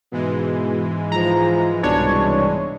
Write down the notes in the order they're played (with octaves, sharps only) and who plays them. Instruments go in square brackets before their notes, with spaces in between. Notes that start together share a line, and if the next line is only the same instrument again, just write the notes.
[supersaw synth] G#2 E3 G#3 [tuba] B2
[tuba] F3 [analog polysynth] A#5
[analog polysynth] C2 D4 C#5 [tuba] B2